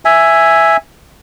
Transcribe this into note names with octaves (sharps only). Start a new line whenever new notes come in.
E5 G#5